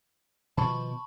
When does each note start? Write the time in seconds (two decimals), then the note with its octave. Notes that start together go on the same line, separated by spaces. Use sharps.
0.57 B2 D#3 F3 A5 B5 C#6